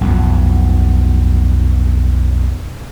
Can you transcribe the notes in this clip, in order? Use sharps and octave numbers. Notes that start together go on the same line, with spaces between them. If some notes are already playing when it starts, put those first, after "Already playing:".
B1 F2